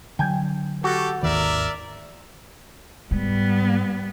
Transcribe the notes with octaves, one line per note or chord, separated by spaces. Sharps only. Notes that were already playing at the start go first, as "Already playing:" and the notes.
D3 F#3 G5 G#5
F#4 G4 A4
G#1 D#2 D#3 A#4 D5 E5
G#2 G3 B3